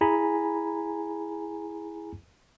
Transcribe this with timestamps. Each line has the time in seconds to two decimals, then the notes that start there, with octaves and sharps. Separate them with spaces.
0.01 E4 G#4 G#5 A#5 B5